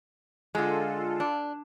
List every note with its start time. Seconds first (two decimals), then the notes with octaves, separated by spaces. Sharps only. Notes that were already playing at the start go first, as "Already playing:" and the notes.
0.55 D3 G#3 F4 A4
1.20 D4